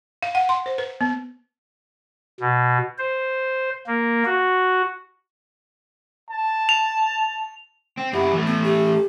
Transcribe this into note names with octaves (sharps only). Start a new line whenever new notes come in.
F5
F#5
C6
C5
B4
B3
B2
C5
A#3
F#4
A5
F7
C4
F#2 E4 G4
E3 A3
B3
G4